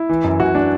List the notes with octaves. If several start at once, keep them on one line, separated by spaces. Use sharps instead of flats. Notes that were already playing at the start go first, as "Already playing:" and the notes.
Already playing: E4
E3
F#2
F#2 F#4
D4